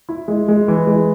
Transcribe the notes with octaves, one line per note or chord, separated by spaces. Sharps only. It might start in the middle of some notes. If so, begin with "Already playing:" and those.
E4
G#3
G#3
E3
G#3